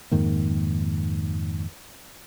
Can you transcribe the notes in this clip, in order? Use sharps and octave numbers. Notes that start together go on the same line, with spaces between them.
F2 G#2 D#3 A#3